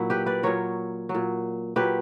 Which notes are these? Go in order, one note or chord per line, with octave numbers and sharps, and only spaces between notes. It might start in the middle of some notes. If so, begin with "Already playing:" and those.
Already playing: A#2 F#3 E4
G4 B4
B4 D5
A#2 F#3 A#4 C#5
F#3
A#2
A#2 F#3 G4 B4